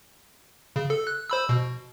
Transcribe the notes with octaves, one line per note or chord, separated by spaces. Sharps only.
C#3
A4
F#6
C5 B5 E6
B2